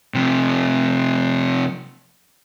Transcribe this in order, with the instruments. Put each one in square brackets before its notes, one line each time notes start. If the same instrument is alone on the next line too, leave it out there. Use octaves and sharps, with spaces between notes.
[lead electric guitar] C3 F3